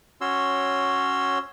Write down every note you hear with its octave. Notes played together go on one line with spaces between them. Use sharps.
C#4 F#4 C#5 C6 E6